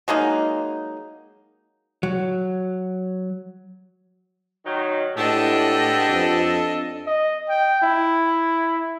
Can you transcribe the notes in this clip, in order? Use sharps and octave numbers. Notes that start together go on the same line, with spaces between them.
F#3 G#3 A#3 D#4
F#3
D#3 F#3 D#4
A2 G#3 B3 D4 G4 A4 D#5
F2
D#5
G5
E4